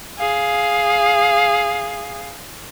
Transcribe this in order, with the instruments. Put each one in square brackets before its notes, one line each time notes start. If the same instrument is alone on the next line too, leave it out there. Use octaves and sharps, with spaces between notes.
[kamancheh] G#4 F5